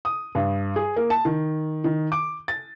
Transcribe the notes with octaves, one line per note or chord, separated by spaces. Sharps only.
D#6
G2
G#4
A#3
A5
D#3
D#3
D6
A6